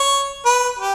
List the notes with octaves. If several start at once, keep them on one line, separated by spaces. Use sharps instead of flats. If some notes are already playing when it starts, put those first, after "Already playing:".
Already playing: C#5
B4
G4